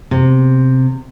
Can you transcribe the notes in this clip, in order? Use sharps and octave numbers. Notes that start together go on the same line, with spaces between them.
C3